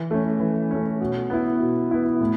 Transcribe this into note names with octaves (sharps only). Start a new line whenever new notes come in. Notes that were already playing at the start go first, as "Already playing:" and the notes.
Already playing: E3
A3 C#4
E3
A3 C#4
B2
B3 E4
B2
B3 E4
A2